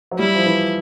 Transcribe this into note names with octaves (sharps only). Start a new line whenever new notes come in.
F#3
G3 E4
F3
E3